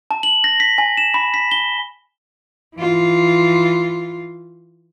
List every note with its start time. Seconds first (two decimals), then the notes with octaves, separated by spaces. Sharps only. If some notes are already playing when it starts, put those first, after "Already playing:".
0.11 A5
0.23 F#7
0.44 A#6
0.60 B6
0.78 G#5
0.97 E7
1.14 B5
1.34 B6
1.51 G7
2.77 E3 F4